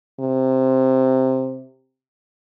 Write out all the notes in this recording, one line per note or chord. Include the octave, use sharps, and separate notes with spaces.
C3